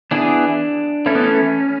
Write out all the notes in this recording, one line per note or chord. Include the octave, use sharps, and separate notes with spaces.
E3 B3 D4 E4 G#4
E3 A3 C#4 E4 A4
B3
C#4